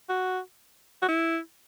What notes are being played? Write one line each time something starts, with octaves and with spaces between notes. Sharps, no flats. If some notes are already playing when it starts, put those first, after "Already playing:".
F#4
F#4
E4